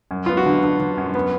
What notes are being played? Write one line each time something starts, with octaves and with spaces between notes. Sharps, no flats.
F#2
B3 F4
F#4
D3
D3
D3
F#2
B3